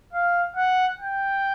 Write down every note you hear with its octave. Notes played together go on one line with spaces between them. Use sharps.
F5
F#5
G5